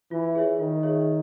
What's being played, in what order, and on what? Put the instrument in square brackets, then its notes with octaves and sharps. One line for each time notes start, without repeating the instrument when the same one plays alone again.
[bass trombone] E3 [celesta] F4
[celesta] G#4 C#5 E5
[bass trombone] D#3 [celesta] F4
[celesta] G#4 C#5 E5